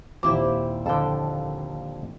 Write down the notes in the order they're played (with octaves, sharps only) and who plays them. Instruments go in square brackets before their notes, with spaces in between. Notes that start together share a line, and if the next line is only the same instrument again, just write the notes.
[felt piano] D#2 A#2 [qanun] C4 E4 G4 [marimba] D6
[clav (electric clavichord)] F2 D3 [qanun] A4 G5